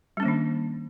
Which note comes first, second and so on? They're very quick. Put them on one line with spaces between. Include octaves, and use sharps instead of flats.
G3 C#4 A#3 D#3 D4